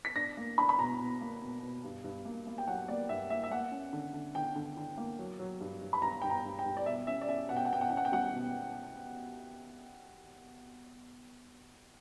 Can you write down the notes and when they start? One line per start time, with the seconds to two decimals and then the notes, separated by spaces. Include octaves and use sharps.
0.05 B6
0.16 D4 A#6
0.37 A#3
0.58 D4 B5
0.69 B5
0.79 B2 A#5
1.00 B2
1.21 A#3
1.42 B2
1.63 B2
1.84 G2
2.04 G2
2.25 A#3
2.47 A#3
2.58 G5
2.67 F#3 F#5
2.88 A#3 D5
3.09 G2 E5
3.30 A#3 E5
3.44 E5
3.51 A#3 F#5
3.72 C#4
3.93 D3
4.14 D3
4.35 D3 G5
4.55 D3
4.77 D3
4.97 A#3
5.19 F#3
5.39 F#3
5.61 G2
5.81 G2
5.93 B5
6.02 G2 A#5
6.22 G2 G5
6.30 A#5
6.45 G2
6.59 G5
6.65 G2
6.77 D5
6.86 B2 E5
7.07 C#4 E5
7.21 D5
7.28 C#4 E5
7.49 B2 F#5
7.57 G5
7.65 F#5
7.71 B2 G5
7.81 F#5
7.90 C#4 G5
7.97 F#5
8.05 G5
8.12 G3 F#5
8.33 B2